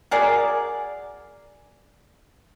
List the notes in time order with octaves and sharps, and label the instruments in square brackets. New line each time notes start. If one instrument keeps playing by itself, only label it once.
[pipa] F#4 G#4 A#4 D5